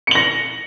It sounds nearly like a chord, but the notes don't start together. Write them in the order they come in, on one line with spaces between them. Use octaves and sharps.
C#7 F#7 A#6